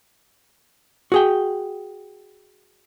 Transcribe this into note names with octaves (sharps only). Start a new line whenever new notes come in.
F#4 G#4 G5